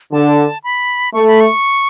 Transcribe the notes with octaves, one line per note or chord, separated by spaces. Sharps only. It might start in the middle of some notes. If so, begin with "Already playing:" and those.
D3 A5
B5
A3 C#6
B5
C#6